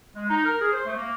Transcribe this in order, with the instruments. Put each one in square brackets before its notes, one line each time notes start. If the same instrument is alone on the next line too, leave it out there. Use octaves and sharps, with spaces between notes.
[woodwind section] G#3
D#4
A#4
G#4
C5
A3
A#3